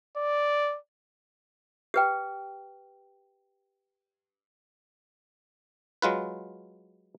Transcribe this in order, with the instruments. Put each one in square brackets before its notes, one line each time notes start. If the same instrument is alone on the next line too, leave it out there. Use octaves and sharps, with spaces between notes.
[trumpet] D5
[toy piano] G4 B4 G5
[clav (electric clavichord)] F#3 G#3 F4 B4